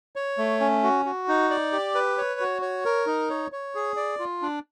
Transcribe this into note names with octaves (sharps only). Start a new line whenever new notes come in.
C#5
A3
C#4
F#4
F#4
D#4
D5
G4
B4
C#5
F#4
C#5
A#4
D#4
C#5
C#5
G#4
D5
F4
D4